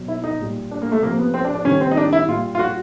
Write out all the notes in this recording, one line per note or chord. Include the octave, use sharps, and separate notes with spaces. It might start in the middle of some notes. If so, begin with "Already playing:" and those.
Already playing: B2 F#3
E4
D#4
A#2 G3
D4
A#3
A3
C3 F3 A#3
B3
C4
D4
D4
C3 D#3 G3 C#4
C4
D#4
D4
E4
A#2 G3 F4
F4
F#4